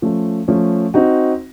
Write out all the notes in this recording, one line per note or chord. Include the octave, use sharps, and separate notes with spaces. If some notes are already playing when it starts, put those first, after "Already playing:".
F3 A3 C#4
F3 A3 C#4
C4 D#4 F#4